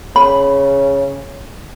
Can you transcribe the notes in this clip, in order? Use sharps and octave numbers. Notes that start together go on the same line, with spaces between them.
C#3 B5